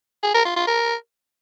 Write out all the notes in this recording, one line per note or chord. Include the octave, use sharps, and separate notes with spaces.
G#4
A#4
F4
F4
A#4